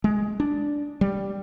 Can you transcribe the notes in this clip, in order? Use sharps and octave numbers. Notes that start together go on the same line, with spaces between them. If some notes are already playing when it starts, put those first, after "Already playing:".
G#3
D4
G3